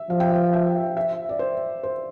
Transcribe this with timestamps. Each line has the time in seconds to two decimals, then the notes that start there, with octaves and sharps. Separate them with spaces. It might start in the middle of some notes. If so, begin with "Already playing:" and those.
Already playing: E5
0.09 F3 F5
0.20 G5
0.31 F5
0.53 E5
0.97 E5
1.29 D5
1.39 C5
1.83 C5